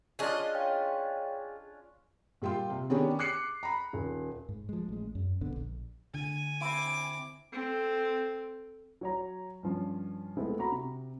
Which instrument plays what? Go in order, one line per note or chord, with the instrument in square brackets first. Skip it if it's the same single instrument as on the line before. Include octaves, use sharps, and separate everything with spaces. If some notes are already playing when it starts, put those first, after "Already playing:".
[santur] C#4 D4 F4 [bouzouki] G#4 D#5
[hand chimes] C#5 F5 G5
[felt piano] A#2 G3 F4 G5 C6
C3
D#3 B3 C#4 D4 G4 G#4
D6 F#6 C7 C#7
A#5 B5
D#1
[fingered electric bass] G#2
F3 G#3
A1 G#3
F#2
D#1 A#1 D3 B3
A#1
[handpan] D3 [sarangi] G#5
[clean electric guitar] C4 E4 [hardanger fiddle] D6
[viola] C4 A4
[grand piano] F#3 C#5 A#5
G2 F3 C#4
G#3 A3 B3 C4 E4
F#4 A#5 B5
C3